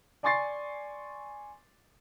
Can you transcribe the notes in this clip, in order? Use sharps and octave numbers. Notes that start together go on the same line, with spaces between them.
D5 G#5 C6 C#6 A6 C7